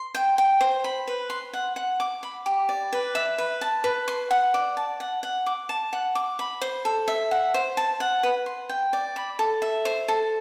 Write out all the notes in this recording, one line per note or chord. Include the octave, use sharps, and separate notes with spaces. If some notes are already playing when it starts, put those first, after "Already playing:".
Already playing: C6
G5
G5
C5
B5
B4
C6
F#5
F#5
D6
B5
G4
D5
B4
E5
B4
A5
B4
C6
F#5
D5
A5
F#5
F#5
D6
A5
F#5
D6
B5
C5
A4
E5
F#5
C5
A5
F#5
B4
C6
G5
D5
B5
A4
E5
C5
A4